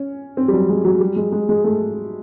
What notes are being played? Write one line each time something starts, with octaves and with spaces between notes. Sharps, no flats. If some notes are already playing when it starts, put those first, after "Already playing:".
Already playing: C#4
C4
G3
F#3
G#3
F#3
G3
G#3
G#3
G#3
A3